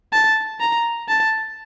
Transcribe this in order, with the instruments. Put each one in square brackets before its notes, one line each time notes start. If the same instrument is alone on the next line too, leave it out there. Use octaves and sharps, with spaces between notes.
[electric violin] A5
A#5
A5